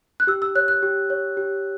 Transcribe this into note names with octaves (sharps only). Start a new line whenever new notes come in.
F#6
G4 E6
E6
C#5 F#6
F#6
G4
C#5
G4